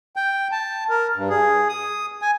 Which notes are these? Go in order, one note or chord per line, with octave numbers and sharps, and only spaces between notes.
G5
A5
A#4
G2
G#4
D#6
G#5